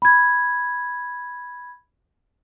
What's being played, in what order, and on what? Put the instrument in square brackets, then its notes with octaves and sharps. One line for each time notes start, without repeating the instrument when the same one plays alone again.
[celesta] B5 G#6